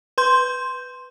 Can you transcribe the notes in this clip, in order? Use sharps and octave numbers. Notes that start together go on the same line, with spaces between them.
B4 C6 G6